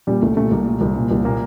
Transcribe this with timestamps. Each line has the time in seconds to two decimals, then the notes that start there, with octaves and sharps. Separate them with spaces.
0.07 A#2 G3
0.22 C2 A3
0.37 A#2 A3
0.51 C2 A#3
0.66 A#2
0.81 C2
0.96 A#2
1.11 C2
1.25 A#2 A#3